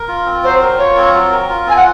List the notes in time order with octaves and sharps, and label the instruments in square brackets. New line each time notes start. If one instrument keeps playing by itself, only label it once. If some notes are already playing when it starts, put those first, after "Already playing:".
Already playing: [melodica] A#4
F4
C4
[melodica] F#3 [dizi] C5
[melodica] A#4
[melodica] F4 [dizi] C#5
[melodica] C4
F#3
A#4
F4
[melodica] C4 [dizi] G#5
[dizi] F#5